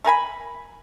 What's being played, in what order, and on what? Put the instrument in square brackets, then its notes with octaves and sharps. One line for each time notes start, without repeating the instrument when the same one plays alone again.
[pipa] A3 A#4 G#5 B5